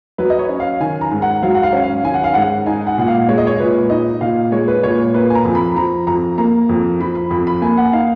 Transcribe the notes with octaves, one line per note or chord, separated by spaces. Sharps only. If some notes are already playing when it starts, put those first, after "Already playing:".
F#3 B4
D#5
C#5
C#4
F5
D#3 G#5
A#5
G#2
F#5
F#3 F5
F#5
F5
C#4
F5
D#3 G#5
F#5
F5
G#2 F#5
D#4 G#5
F#5
A#2 F#5
F5
G#3 C#5
D#5
C#5
A#2 B4
D#4 D#5
A#2 F5
G#3 C#5
B4
A#2 C#5
A#3 B4
G#5
A#5
F2
B5
F3 A#5
F2 A#5
A#3 A#5
F2
F3 B5
B5
F2 B5
B5
A#3 G#5
F#5
D#4 F5